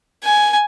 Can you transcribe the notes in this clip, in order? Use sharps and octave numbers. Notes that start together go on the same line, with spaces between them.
G#5